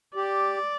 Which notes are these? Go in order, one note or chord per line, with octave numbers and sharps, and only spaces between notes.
G4 D5